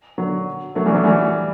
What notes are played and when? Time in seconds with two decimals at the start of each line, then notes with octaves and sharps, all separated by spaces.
0.18 D3 F#3
0.75 F#3 A3
0.86 E3 G3
0.95 F#3 A3
1.04 E3 G3